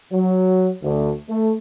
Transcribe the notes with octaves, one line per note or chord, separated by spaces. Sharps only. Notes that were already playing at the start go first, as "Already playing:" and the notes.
F#3
D2
A3